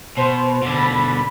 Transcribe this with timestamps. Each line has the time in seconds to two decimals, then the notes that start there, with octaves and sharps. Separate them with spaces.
0.17 B2 C5
0.62 B2 D3
0.75 B5